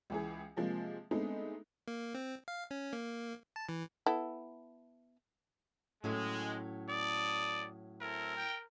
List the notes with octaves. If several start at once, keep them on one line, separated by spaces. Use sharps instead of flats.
C#2 E3 G#4
C3 F3 G#3 A#3
G#3 A3 B3 C4 D4 D#4
A#3
C4
F5
C#4
A#3
A5
E3
B3 E4 A4
A2 F#3 G#3 C#4
A4 D5 D#6
C4 E4 A4 A#4
G5